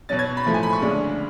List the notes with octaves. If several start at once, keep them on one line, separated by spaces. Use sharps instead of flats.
B2 F#3 C#4 A6
G#6
B5
A2 F3 A3
G#5
B5
C#6
D2 C#3 G#3 D4